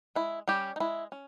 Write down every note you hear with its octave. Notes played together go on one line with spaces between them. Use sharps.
G#3 E4
G3 C#4 G4
D#4
G#3 E4
C#4